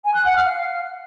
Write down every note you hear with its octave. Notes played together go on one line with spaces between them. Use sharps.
G#5
F#6
F#5
F6
F5